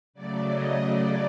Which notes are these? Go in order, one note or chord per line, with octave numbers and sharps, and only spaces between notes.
C#3 F#3 A3 D5
D#5
D5